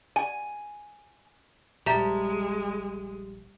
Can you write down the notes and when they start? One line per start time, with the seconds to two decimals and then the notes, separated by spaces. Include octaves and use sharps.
0.16 G#5
1.86 D#1 A#1 G3 G#3 E5 A5 A#5